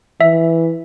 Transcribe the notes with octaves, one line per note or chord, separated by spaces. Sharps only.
E3 E5